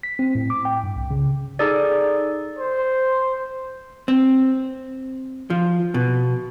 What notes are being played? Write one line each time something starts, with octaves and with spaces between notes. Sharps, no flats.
B6
C4
A2
D6
G5
G2
C2
C#3
D#4 G#4 A4 D5
C5
C4
F3
B2